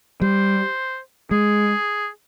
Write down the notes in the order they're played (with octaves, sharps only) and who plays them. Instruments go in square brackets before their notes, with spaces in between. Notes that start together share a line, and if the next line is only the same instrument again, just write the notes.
[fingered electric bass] G3 [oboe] C5
[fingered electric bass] G#3 [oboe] G#4